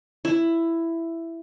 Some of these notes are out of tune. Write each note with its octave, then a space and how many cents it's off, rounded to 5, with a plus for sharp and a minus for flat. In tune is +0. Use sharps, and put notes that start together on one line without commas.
E4 +10